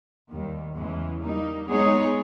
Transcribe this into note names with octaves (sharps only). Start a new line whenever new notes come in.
D#2 D#3 G3
E2 C#3 E3 G#3
G3 A#3 D#4
G#3 B3 D#4 G#4 C#5